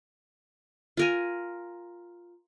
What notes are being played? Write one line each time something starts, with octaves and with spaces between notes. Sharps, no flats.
F4 A#4 G#5